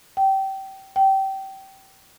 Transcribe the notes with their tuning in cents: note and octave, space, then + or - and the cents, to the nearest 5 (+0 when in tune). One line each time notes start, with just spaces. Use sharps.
G5 -20
G5 -20